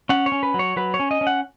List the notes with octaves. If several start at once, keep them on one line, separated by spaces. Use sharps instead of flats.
C#4 F#5
C#5
C#4
B4
F#3
C#5
F#3 B4
C#5
C#4
D#5
C#4
F#5